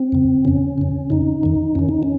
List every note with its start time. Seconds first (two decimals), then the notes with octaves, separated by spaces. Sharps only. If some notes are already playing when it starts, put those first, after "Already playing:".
Already playing: C4
0.12 F2 C#3
0.45 F2 C#3 C#4
0.78 F2 C#3
1.10 F2 C#3 D#4
1.43 F2 D#3
1.75 F2 D#3 C#4
1.89 D#4
2.03 C#4